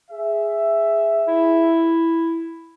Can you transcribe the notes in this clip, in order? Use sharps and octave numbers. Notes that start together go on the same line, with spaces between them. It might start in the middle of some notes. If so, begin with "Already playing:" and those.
G#4 E5
E4